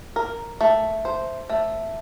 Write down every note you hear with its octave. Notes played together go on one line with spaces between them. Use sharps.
A#4
A3
C5
A3